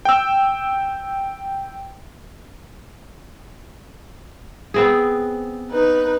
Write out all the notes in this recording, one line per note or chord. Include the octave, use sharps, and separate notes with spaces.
G5 E6
B3 C4 G#4
D#4 B4